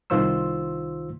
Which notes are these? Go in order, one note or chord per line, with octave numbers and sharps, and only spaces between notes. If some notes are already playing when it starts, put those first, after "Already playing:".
C2 D#3 F4 C5 C6 E6